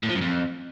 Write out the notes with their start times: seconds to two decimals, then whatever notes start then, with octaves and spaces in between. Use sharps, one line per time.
0.03 A2
0.09 F3
0.15 F#2
0.21 F2